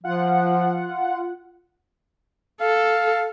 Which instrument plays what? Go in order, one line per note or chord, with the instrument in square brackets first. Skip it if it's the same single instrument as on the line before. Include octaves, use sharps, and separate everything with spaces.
[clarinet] F3 [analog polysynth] F4 F#5
[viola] A4 [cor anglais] F5